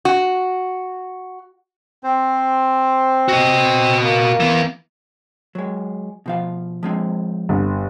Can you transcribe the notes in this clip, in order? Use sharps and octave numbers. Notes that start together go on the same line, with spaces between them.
F#4
C4 C5
F#4 D#5
A#3
E3 B3
F#3 G#3
B2 F3 F5
F3 G#3 C4
G1